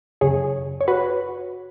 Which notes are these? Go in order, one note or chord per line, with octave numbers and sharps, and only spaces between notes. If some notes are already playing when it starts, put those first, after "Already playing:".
F#2 C#3 G#4 C#5
C#5
F#4 B4